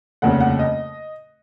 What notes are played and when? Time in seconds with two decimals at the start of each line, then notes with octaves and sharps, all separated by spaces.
0.22 F1 D#2 C#3 F#5
0.40 F#5
0.59 D#5